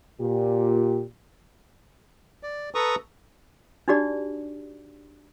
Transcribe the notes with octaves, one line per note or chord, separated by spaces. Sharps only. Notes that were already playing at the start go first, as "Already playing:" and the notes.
A#2 G4
D5
A4 B4 A#5 C#6 D#6
D4 D#4 F#4 G4 D5